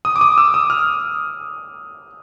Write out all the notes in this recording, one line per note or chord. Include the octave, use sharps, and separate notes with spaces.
D#6
D6
D#6
E6
D#6
F6